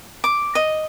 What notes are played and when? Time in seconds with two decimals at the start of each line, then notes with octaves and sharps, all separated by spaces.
0.24 D6
0.55 D#5